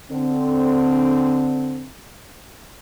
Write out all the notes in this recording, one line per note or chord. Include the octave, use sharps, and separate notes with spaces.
D3 C4